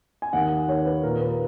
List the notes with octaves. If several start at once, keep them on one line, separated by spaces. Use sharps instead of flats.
G#5
D#2 F#5
D#2 C#5
B4
A#2 A#4
B4